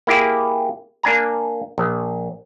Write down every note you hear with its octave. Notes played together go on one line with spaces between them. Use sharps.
A#3 E4 G4 G#4
A#3 D4 G#5 A#5
A#1